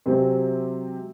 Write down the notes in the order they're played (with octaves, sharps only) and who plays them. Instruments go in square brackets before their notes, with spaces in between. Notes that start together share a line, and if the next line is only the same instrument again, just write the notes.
[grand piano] C3 F#3 G#3 C4